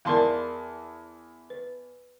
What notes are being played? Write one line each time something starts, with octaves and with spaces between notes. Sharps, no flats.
E2 A#4 D5 F5 A5 C6
B4